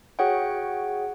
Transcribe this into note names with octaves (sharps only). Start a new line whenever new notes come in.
F#4 G#4 C#5 F#5 G5